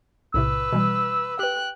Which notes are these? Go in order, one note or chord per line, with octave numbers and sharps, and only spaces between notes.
B1 A2 C3 B4 E6
B2 E3 G3
G4 B4 G5 F#6